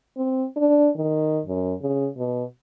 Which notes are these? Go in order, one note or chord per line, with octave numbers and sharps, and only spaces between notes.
C4
D4
D#3
F#2
C#3
B2